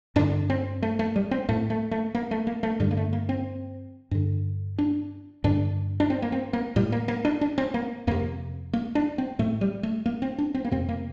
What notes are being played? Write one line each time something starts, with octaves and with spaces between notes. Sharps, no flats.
G2 D3 D4
C4
A3
A3
G3
C4
A2 A3
A3
A3
A#3
A3
A#3
A3
G2 D3 G3
A#3
A3
A#3
C4
G2 D3
D4
G2 D3 D4
D4
C4
A#3
C4
A#3
A2 G3
A#3
A#3
D4
D4
C4
A#3
F2 C3 A#3
A#3
D4
C4
A2 A3
G3
A3
A#3
C4
D4
C4
A#3
F2 C3 C4
A#3